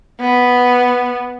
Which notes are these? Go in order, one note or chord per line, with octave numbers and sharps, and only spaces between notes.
B3